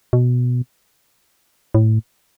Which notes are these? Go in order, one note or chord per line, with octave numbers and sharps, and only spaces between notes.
B2
A2